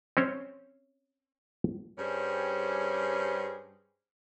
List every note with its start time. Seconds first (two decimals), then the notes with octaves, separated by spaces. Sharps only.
0.17 C4 C#4 C5 C#5
1.99 G2 G3 C#4 G#4 C5